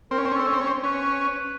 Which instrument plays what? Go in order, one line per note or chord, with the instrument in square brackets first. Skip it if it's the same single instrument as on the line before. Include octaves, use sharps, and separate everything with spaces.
[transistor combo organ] C4 [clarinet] A#4
[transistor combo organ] C#4
C4
C#4
[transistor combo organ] C4 [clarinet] A4
[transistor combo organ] C#4
C4
C#4
C4
[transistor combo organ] C#4 [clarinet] B4